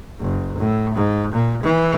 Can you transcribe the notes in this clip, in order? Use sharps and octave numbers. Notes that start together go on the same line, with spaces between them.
F#1
A2
G#2
A#2
E3